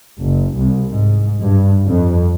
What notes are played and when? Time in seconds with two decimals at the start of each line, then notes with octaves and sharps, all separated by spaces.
0.21 F#1
0.57 C2
0.90 G#2
1.43 G2
1.87 F2